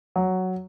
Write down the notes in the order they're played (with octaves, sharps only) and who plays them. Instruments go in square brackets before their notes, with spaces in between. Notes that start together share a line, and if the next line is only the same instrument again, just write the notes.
[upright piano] F#3